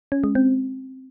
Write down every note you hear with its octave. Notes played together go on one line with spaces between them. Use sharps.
C#4
G#3
C4